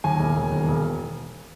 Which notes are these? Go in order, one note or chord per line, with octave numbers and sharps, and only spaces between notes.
D#2 G#5
E1
E1
D#2
E1